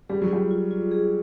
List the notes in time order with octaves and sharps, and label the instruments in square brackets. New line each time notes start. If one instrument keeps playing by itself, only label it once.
[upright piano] G3 [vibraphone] G#4
[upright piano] F#3
[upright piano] G3 [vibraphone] F4
[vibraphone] F4
F4
G#4